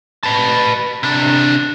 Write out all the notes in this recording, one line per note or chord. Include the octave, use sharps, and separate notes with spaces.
B4 A5
C3 D4